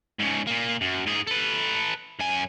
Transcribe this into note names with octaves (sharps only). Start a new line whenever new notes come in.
G#2 C#3
A#2 A#3
F#2
G#2 G#4
A4 B4
F#2 G#5